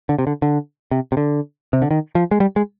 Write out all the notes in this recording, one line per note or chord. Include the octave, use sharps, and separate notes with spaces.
D3
C3
D3
D3
C3
C3
D3
C3
D3
D#3
F3
G#3
G3
G#3